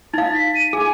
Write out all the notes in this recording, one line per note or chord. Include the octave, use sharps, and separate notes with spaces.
D#4 F5 A6
B6
D#7
G#4 G#5